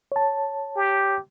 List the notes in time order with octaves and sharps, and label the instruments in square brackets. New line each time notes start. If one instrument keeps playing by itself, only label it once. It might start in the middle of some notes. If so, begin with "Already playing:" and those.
[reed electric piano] C#5 A5
[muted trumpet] G4